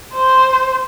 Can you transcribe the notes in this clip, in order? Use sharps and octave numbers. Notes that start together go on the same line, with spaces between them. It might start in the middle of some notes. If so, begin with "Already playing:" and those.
C5